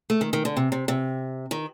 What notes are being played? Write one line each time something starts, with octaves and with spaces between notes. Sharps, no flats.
A3
D#3
D#3
D3
C3
C3
C3
D#3